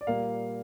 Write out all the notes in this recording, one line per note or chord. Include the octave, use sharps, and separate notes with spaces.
D5
A#2 G3 A#3 F5